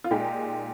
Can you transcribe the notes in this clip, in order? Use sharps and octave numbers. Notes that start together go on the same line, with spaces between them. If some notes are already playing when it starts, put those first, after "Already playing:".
F4
A#2 G#3 D#4 G4